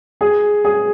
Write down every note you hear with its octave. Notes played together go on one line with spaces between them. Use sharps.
G#4
G#4